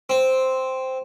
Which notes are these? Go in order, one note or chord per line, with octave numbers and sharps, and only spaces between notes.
C4